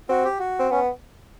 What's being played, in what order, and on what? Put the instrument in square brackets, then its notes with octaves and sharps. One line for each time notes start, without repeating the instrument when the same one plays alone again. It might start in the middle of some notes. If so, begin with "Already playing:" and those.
[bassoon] C4 [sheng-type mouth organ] F#4
[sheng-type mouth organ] G4
F#4
[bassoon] C4
[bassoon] B3 [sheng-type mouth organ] C#4